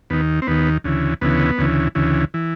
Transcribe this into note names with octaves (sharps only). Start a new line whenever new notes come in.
D#2 D#3 B3
C4
D#2 D#3 B3
D2 C#3 E3
D2 C#3 E3 B3
D2 C#3 E3
D2 C#3 E3
E3